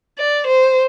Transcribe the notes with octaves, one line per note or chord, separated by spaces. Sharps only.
D5
C5